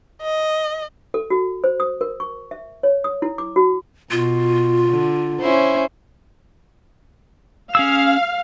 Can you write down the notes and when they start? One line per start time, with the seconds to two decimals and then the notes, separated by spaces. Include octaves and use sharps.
0.22 D#5
1.14 A4
1.30 F#4
1.64 C5
1.80 D#6
2.01 A#4
2.20 C#6
2.51 E5
2.83 C#5
3.04 D#6
3.22 E4
3.38 D6
3.56 F#4
4.11 B2 F4
4.89 D3
5.40 C#4 E4 C5
7.75 C#4 G#4 F5 E6